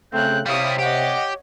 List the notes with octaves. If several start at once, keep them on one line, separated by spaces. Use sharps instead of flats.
C#3 A3 C4 F#6 G6
C3 G3 E4 C#5 F5 D#6
G4 D#5 F#5